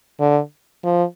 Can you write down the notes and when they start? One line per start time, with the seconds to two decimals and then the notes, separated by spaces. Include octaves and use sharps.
0.20 D3
0.84 F3